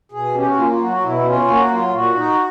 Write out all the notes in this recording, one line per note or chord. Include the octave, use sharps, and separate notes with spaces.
B2 G#4
C#4 G4
F#4
A#3 F4
F4
F#3 F#4
B2 E4
C#4 F4
A#3 F#4
F#3 F4
A#2 F#4
D#4